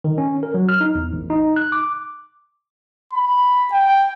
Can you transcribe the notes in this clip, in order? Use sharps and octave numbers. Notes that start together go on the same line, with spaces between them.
D#3
C#4
A#4
F#3
F6
D#4
E2
A1
D#4
F#6
D6
B5
G5